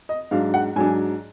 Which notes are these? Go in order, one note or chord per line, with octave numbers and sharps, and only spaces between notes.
D#5
G#2 F#3 D4 F5
F#5
G#2 F#3 D4 G#5